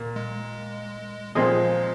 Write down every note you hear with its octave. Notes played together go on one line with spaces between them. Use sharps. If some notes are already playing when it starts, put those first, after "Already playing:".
Already playing: A#2 A#3
G#3
A#2 F3 G#3 C4 G#4 D#5